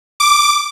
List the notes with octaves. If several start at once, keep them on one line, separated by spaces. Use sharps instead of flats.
D6